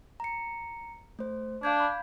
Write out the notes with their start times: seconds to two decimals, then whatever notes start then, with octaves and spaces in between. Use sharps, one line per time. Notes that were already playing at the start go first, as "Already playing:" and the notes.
0.20 A#5 C#7
1.19 A3 C5
1.63 D4 F5 G6 G#6
1.80 B5